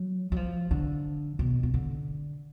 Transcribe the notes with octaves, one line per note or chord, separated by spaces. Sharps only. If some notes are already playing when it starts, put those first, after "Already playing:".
Already playing: F#3
F#3
F3
D3
B2
B2
D3